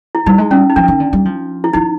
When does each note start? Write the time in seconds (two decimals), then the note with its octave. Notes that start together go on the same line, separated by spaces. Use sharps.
0.15 E4
0.26 G3 D#4
0.38 G#3
0.50 G3 C#4
0.70 D#4
0.76 F3 D4
0.88 D#3
1.00 D3
1.13 G3
1.25 F3
1.64 E4
1.73 F3 D#4